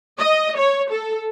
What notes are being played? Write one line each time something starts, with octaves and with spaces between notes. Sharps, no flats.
D#5
C#5
A4